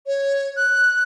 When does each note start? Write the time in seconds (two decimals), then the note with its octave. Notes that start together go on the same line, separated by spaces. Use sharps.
0.06 C#5
0.57 F#6